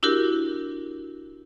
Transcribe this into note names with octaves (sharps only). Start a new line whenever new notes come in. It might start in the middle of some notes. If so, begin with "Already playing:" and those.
D4 E4 F#4 G4 A#4